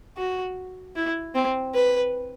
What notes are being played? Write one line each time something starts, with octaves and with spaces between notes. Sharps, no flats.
F#4
E4
C4
B4